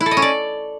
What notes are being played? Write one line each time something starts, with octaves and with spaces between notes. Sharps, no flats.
E4
A4
D#5
C#4
D5